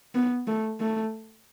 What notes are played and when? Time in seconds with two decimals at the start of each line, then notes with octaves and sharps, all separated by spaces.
0.15 B3
0.47 A3
0.80 A3